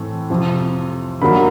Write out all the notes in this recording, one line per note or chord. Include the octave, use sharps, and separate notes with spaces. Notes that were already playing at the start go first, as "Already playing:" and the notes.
Already playing: A2 E3 A3 C4
F2 C3 F3
G2 D#3 F#3 A#3 B5